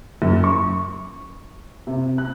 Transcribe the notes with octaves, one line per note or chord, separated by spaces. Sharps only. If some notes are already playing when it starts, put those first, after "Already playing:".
F#2
C#6
C3
F#6